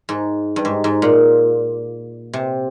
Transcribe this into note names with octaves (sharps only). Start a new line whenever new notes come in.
G#2
G2
G#2
G#2
A#2
C3